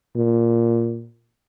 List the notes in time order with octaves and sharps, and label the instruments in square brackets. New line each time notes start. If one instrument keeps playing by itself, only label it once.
[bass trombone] A#2